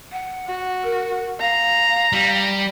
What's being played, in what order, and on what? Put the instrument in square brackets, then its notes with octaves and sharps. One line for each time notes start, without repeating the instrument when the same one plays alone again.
[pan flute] F#5
[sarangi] F#4
[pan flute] A#4
[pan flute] F5 [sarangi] A#5
[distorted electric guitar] G3